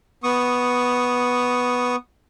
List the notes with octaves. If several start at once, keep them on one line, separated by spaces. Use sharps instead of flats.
B3 C#6 D#6